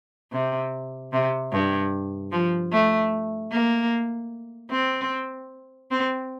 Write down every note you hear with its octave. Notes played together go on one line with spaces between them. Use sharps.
C3
C3
G2
F3
A3
A#3
C4
C4